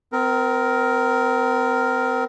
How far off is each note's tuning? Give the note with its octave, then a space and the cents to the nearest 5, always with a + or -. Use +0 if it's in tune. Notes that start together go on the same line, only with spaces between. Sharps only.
C4 -35 A#4 +0